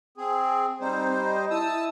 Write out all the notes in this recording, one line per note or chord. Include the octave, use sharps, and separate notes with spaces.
C4 G#4
G3 C4 D#4 C5
D#5
E4 A5 D#6 E6